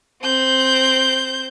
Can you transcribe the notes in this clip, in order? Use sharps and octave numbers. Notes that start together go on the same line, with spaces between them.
C4 G6